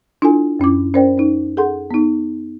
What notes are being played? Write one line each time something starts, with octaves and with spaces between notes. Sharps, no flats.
D4 E4 F4 A4 G#5
F#2 C#4 E4 D6
C#4 A#4 C5 D5 G5
C#4 D#4
G#4 A4 F#5 C6
B3 D#4